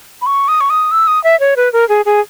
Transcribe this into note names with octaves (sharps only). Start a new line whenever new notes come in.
B5
C#6
D#6
C#6
D#6
E6
D#6
E5
C#5
B4
A#4
G#4
G#4